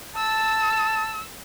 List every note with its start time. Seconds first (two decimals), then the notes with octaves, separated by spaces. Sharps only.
0.17 A5 E6